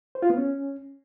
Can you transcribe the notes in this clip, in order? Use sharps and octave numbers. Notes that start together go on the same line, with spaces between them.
C5
F4
B3
C#4